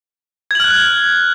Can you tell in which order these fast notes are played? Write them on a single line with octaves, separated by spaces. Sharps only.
G#6 F#7 F6 F#6